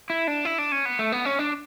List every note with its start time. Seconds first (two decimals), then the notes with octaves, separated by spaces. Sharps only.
0.10 E4
0.27 D4
0.45 E4
0.58 D4
0.72 C#4
0.85 B3
0.99 A3
1.12 B3
1.25 C#4
1.39 D4